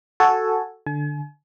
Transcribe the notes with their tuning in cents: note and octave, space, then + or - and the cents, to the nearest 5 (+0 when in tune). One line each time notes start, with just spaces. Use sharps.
F#4 +0 A4 +0 G#5 +0
D3 +0 G#5 +40